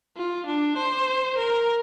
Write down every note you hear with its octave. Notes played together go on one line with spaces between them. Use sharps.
F4
D4
C5
A#4